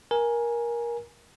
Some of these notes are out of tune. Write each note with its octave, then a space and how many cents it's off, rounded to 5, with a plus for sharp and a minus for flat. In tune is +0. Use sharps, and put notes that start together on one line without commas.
A#4 +20 G#5 +0